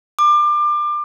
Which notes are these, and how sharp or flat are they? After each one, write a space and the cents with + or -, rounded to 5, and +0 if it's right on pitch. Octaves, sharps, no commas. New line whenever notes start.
D6 +30